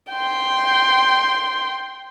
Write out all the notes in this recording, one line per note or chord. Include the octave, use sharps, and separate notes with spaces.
G5 C6